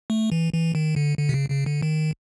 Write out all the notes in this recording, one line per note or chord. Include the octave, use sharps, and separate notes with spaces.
A3
E3
E3
D#3
D3
D3
C3
C#3
C#3
D3
D#3